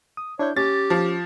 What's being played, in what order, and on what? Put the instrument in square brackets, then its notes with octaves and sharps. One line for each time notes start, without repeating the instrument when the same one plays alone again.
[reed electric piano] D#6
[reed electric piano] D4 E4 G6 [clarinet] C#5
[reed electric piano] C#4 [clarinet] G4 [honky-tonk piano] A6
[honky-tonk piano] F3